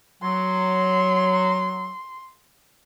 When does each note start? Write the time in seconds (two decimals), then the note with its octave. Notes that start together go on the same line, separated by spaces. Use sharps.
0.23 F#3 C6